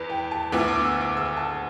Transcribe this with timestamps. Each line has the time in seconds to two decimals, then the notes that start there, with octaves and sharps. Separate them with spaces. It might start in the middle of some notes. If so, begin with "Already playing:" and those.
Already playing: E2 B4
0.10 G5
0.31 A5
0.52 D2 D3 B3 E4 D6
0.68 D6
0.84 E6
1.01 D6
1.17 E6
1.37 A5